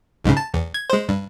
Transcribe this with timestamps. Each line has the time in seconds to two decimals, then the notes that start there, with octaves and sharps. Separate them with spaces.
0.24 B1 G#2 C#3
0.37 A5
0.54 E2
0.74 G#6
0.90 G#3 C5
1.09 G2